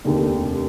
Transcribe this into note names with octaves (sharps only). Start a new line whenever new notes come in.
F1 D#2 D3